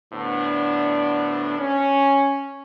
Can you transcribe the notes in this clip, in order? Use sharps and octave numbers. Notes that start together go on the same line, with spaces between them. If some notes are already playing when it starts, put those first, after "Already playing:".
D2 A2 B3 D4
C#4